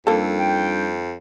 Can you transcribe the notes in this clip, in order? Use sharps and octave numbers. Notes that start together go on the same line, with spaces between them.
F2 G3 A#3 D4 D#4 A4
G5